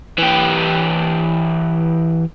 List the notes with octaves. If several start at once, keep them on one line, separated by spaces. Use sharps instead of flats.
E3 G4